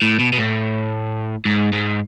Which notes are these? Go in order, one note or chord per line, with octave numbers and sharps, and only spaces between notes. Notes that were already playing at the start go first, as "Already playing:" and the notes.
A2
B2
B2
A2
G#2
G#2